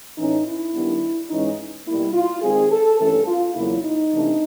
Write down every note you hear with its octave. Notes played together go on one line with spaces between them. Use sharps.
A2 E3 A3 C#4 D#4
E4
D#3 G3 B3 D4
G#2 E3 G#3 C#4 D#4
B2 G3 A#3 E4
F4
D#3 G#3 C4 G#4
A4
G2 E3 A3 C#4 A4
F4
E2 C#3 F#3 A#3 E4
D#4
C3 E3 A3 D4